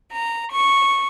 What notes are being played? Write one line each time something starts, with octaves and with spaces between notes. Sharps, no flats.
A#5
C#6